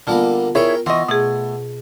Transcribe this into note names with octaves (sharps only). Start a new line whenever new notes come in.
D3 G3 A#3 B3 F4 A5
E4 G#4 A#4 C#5 G5
E3 B3 D#5 C6 C#6
B2 A3 G#4